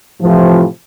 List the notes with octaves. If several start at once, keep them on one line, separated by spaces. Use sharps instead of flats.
A2 C3 E3 F3